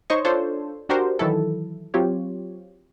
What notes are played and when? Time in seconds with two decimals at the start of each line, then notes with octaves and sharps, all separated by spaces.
0.10 D#4 C5 C#5 D#5 C#6
0.25 D4 F4 A4 C5 C#5
0.89 D4 F#4 G4 A#4 C5
1.19 D#3 E3 F#3 E4 A4
1.94 F#3 C4 F4 G4 C#5